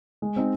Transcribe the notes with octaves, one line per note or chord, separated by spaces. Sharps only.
G#3
C4 D#4